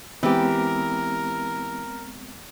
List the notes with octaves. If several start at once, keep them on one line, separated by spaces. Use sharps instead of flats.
E3 G#3 B3 C4 G4 A#4